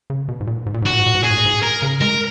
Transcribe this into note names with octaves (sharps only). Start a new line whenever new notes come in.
C#3
B2
G#2
A#2
G#2
A#2
G#2
A#2 F#4
G#2
A#2
G#2
A#2 G#4
G#2
A#2
G#2
A#4
C#3
G#3 A#4